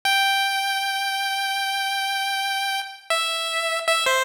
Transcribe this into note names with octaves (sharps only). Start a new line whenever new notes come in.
G5
E5
E5
C5